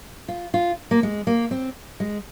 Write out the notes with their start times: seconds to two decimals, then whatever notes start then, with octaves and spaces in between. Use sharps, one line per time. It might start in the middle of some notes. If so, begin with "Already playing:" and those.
0.28 F4
0.54 F4
0.91 A#3
1.03 G#3
1.27 A#3
1.51 C4
2.00 G#3